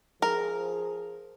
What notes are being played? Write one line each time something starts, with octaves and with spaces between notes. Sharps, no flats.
F3 G#4 A#4